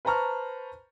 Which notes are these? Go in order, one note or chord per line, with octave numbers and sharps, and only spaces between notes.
B4 C5 A5 A#5 C#6 F6